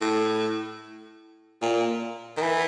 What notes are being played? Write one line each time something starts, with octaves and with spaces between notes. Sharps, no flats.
A2
A#2
D#3
E3